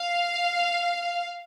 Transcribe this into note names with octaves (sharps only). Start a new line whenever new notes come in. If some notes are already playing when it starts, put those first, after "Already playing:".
Already playing: F5